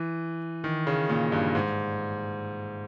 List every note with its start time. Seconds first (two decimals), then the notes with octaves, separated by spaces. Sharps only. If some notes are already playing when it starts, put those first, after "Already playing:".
Already playing: E3
0.64 D#3
0.87 C#3
1.09 A#2
1.32 G2
1.55 G#2